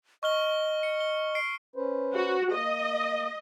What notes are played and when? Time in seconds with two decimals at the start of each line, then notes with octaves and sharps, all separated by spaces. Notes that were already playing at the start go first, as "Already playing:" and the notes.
0.23 D#5 C#6 F6 G7
0.83 C#7
1.00 G7
1.35 C7 D7
1.76 C#4 B4 C5
2.14 F#4
2.53 A#3 D#5